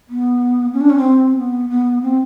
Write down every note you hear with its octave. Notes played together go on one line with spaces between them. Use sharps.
B3
C#4
D4
C#4
C4
B3
B3
C4